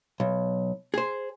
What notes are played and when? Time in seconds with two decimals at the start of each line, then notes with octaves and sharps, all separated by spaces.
0.20 B1
0.94 G#4 C5